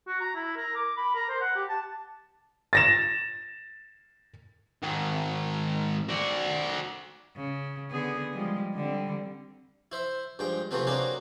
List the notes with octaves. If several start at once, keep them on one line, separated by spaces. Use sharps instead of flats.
F#4
A#5
E4
A#4
D6
B5
A#4
C5
F#5
G4
A5
A6 A#6 E7
G#2 D#3
F#4 D5
C#3
D3 B3 G#4
F3 G3 G#3
D3 G3 C4
E4 C5 E5
G2 F3 G#3 G5
C3 E3 F3 A3 B3 C4
F#3 A#3 C4 D4 G#4 B4